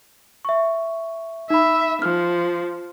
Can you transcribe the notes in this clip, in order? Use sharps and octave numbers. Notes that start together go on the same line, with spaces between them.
E5 C#6
D#4 E5 B5
F3 F6